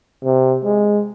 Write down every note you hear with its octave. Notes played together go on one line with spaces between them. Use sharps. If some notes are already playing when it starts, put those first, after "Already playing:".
C3
G#3